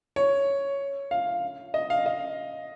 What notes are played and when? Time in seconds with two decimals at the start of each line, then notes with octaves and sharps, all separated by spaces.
0.16 C#5
1.11 F5
1.74 D#5
1.90 F5
2.06 D#5